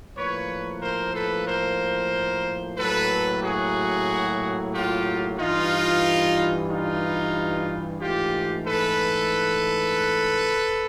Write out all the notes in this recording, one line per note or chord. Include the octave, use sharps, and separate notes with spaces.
A2 F3 A#3 B4 C#5
A#4 C5
A4 B4
A#4 C5
A2 F#3 A#3 A4 B4
F#4 G#4
F4 G4
G2 E3 G3 D#4 F4
D#4 F4
G#2 E3 A3 F4 G4
A4 B4